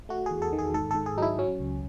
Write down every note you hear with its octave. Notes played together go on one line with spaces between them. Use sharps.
A3 F#4
E2 G#4
A4
D#3
G#4
G#2 A4
G#2 A4
G#4
F#3 D#4 E4
F#3 C#4
C#2